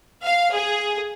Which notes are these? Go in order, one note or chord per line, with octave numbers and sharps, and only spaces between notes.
F5
G#4